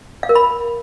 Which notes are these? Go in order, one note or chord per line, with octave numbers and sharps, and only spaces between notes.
F5
A#4
B5